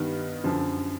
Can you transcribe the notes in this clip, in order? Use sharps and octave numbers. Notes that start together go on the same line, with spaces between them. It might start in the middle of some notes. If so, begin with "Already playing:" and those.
Already playing: G2 D#3 G3 B3 D#4
F#2 D3 F3